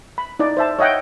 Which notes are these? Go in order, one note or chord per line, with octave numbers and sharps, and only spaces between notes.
B5
D#4 E4 D5
C5 E5 A5
C#5 D#5 E5 F#5 G5